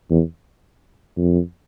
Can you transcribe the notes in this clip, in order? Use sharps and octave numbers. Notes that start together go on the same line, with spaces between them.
E2
F2